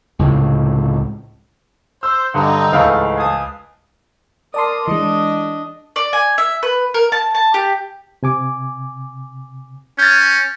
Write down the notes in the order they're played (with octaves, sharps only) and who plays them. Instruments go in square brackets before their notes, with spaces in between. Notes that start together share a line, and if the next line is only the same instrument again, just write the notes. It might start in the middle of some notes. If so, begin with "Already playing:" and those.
[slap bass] C#2 A2 C3
[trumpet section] C5 [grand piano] E6
[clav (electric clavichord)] G2 D3 F#5 [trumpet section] C4 D#4
[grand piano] C#2 F5 F6 [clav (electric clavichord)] G#2 E3 A3
[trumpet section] G#5 A5 D#6
[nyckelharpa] A#4 D#6 [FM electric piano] D5 A5 C6
[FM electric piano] E3 G#3 [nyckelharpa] D4 D#5
[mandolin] D5
G#5
E5
B4
A#4
A5
A5
G4
[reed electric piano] C3 G#5 D6
[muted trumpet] C#4 [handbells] G6 A6